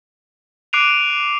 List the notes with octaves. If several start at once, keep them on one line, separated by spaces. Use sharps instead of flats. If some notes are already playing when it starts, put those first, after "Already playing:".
D6 F#6 C7 D7 D#7 F7